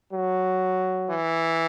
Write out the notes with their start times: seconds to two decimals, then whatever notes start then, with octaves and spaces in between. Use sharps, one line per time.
0.12 F#3
1.10 E3